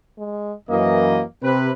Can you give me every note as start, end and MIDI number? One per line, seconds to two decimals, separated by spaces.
0.18 0.53 56
0.70 1.23 42
0.70 1.23 52
0.70 1.23 58
0.70 1.23 75
1.43 1.70 48
1.43 1.72 60
1.43 1.70 71